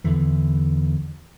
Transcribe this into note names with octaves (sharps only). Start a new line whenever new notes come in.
E2 D3 E3